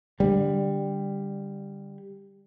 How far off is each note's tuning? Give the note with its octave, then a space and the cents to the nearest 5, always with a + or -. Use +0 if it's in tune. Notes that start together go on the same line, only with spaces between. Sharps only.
D3 +0 G3 +10